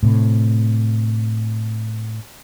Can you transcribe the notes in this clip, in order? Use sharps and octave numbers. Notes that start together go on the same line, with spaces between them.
A2 C3